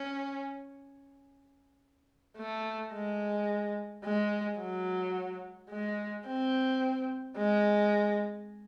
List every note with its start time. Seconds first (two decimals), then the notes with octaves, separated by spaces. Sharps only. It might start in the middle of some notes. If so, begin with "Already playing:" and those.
Already playing: C#4
2.37 A3
2.93 G#3
4.04 G#3
4.59 F#3
5.70 G#3
6.26 C4
7.37 G#3